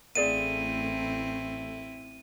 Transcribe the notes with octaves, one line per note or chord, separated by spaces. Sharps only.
A1 A3 C4 E4 G#4 D5 F5 D#7